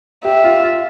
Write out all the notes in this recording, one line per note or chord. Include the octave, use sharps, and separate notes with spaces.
G4 E5
F4
F4